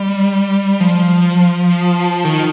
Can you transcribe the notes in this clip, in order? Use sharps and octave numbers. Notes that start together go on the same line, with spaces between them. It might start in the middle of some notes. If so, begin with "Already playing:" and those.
Already playing: G3
F3
D#3